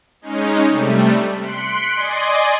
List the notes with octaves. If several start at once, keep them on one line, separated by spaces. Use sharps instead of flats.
G#3 C#4 D#4
C3 G3 A3
C6 F#6 B6 C#7 D7
D5 D#5 G#5 C6